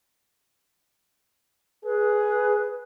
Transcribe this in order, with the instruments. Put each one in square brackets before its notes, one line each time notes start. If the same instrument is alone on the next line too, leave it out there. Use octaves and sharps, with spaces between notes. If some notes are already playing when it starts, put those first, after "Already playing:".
[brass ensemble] G#4 [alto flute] B4